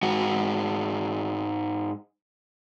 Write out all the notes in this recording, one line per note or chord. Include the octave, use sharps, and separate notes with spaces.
G#2 F#4